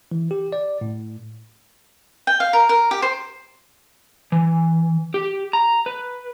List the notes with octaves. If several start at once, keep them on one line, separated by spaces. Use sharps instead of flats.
E3
G4
D5
A2
G5
F5
A#4
A#4
G4
C5
E3
G4
A#5
B4